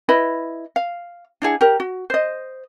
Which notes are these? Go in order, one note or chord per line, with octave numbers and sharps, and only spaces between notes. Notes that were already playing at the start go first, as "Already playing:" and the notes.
E4 B4 D#5 B5
F5
D4 E4 G#4 F#5
G4 A#4
F#4
C5 D#5